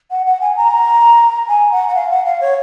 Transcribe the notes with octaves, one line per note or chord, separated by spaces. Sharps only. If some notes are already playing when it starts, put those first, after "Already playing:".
F#5
F#5
G#5
A#5
G#5
F#5
F#5
F5
F#5
F5
C#5